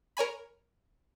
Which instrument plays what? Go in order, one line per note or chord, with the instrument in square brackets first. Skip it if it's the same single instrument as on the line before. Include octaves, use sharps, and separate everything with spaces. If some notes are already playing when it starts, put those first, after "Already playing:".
[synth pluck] A#4 C#5 G#5 B5